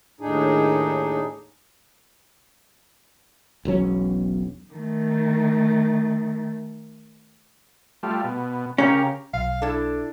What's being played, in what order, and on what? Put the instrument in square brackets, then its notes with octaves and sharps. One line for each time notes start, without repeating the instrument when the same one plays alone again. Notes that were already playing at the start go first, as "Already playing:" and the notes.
[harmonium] D#2 A2 D4 D#4 G#4
[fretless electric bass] E1 B1 F#3 C#4
[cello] D#3 A3
[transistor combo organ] G3 A3 F4
B2
[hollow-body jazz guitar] C#3 C#4 [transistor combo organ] G4 A#4 F5
[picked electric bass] B1 [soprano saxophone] F5
[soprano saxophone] D4 [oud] E4 A4